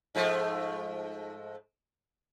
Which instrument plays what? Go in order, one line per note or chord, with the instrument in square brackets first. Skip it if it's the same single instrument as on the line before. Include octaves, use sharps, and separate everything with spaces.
[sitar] G#2 F3 A3